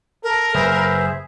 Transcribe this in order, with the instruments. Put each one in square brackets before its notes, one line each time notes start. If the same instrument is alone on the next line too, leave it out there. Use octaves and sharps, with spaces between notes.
[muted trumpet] A4 [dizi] A#4
[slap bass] F#1 [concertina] G#4 C5 E5 [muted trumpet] B4